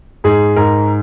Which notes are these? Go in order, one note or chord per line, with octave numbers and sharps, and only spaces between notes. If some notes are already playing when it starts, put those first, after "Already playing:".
G#2 G#4
G#2 A#4